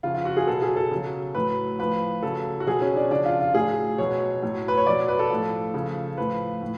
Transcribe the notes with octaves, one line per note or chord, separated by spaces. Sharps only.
C#3 F3 F4
F4
F#4
G#4
B2 F#3 A4
G#4
A4
C#3 F#3
A2 F#3 B4
A2 F3 B4
C#3 F#3 A4
F#4
B2 F#3 G#4
C#4
D4
C#3 F3 D4
F4
F4
A2 F#3 G#4
B2 F#3 C#5
A2 F#3
B4
C#5
B2 F#3 D5
B4
A4
A2 F3
C#3 F3
A2 F3 B4
A2